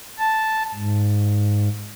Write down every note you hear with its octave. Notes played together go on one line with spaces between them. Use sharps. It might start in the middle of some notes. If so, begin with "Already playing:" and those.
A5
G#2